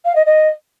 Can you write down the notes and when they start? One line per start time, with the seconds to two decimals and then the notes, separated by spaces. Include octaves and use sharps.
0.05 F5
0.15 D#5
0.26 D#5